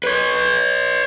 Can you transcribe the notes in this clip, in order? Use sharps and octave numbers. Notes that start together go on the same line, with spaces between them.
B4 C#5